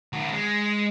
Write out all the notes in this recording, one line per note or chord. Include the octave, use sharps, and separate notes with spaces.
D#3 F#4
G#3